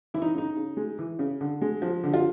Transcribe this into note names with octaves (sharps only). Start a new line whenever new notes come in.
E3 E4
D#4
C#3 D#4
C#3
G#3
E3
C#3
D3
G#3
F3
D3
F4